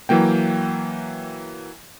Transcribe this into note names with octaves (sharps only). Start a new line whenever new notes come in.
E3 F#3 A#3 G5